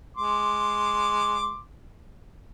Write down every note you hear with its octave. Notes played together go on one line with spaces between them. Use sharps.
G#3 C6 D6